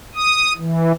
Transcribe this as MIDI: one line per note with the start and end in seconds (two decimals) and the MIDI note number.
0.15 0.53 87
0.57 0.92 52